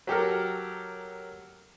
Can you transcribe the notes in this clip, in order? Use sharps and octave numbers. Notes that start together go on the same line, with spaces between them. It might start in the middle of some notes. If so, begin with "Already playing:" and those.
F#3 G4 A4 A#4